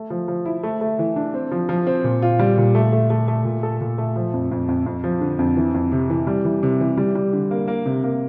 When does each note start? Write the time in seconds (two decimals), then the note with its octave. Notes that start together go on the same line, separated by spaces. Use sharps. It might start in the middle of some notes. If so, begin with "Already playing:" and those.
Already playing: A3
0.10 F3
0.28 F3
0.46 E4
0.63 A3
0.81 A3
0.99 E3
1.16 D4
1.34 C4
1.51 F3
1.69 F3
1.87 C4
2.04 A#2
2.22 F4
2.39 G3
2.57 A#2
2.75 A3
2.92 A3
3.10 A3
3.28 A3
3.45 A#2
3.63 A4
3.81 A#2
3.98 A3
4.16 F3
4.34 F2
4.51 F2
4.69 F2
4.86 F2
5.04 F3
5.21 D3
5.39 F2
5.57 E3
5.74 F2
5.92 C3
6.10 E3
6.27 G3
6.45 E3
6.63 C3
6.80 E3
6.97 G3
7.15 G3
7.33 D3
7.51 A#3
7.68 A#3
7.86 C3
8.04 A#3